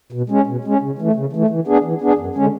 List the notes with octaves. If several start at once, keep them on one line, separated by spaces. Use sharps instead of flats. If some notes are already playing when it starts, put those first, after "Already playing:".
B2
G#3 C#4
B2
G#3 C#4
C#3
E3 A3
C#3
E3 A3
E3
B3 D4 G#4
E3
B3 D4 G#4
F#2
D3 G#3 C#4